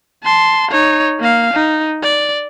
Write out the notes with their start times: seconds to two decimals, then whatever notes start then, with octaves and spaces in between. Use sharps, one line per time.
0.23 A5 C6
0.71 D#4 C#5
1.20 A#3 F5
1.53 D#4
2.03 D5